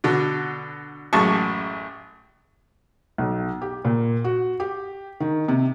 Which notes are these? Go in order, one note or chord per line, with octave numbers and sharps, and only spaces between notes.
B2 D3
A1 F#2 G#3 A5 C#6
B1
G4
A#2
F#4
G4
D#3
C3